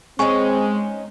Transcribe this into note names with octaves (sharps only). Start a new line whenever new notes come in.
G#3 C4 C#4 D#4 G#5 C#6